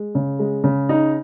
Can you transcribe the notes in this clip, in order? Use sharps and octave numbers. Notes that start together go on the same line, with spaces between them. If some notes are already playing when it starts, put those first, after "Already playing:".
Already playing: G#3
C#3
G#3
C#3
D#4